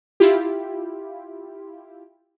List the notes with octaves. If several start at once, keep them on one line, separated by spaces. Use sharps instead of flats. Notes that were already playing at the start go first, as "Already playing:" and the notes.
E4 F4 G4